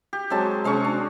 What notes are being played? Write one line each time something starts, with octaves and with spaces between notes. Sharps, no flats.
G4
F#3 G#3 C4 A5
C3 G#3 C#4 C#6
D4